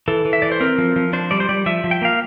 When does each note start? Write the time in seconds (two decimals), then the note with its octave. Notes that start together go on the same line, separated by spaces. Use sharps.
0.08 E3 A4
0.25 E3
0.33 E5
0.42 E3 D5
0.52 C5
0.60 C4 A#4
0.78 F3
0.96 F3
1.13 D4 C5
1.31 G3 D5
1.40 C5
1.49 G3 D5
1.66 F3 E5
1.84 F3
1.91 G5
2.02 A#3 F5